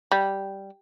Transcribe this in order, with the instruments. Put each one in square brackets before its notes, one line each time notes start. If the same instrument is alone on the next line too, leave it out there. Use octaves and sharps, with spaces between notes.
[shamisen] G3